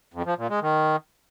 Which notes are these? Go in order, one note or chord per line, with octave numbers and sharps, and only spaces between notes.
F2
F3
A#2
G#3
D#3